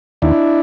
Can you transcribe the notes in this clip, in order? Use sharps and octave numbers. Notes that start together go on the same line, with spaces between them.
D#2 D4 E4